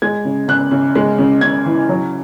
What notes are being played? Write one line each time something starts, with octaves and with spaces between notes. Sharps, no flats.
G#3 G#6
C#3
C#3 F#6
C#3
G#3
C#3
C#3 G#6
E3
F#3